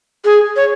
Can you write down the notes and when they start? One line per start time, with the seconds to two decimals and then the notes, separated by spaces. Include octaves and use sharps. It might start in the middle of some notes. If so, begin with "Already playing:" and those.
0.25 G#4
0.56 C#5